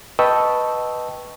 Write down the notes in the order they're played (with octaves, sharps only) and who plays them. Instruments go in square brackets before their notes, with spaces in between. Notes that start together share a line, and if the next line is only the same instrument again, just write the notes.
[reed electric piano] B4 D#5 G5 A5 C#6 E6